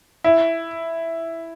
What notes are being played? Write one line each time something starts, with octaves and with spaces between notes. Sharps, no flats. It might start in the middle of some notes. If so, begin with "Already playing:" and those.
E4